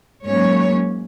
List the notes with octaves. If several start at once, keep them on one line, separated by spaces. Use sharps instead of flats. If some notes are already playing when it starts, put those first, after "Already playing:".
G#2 F#3 A#3 C#4 C#5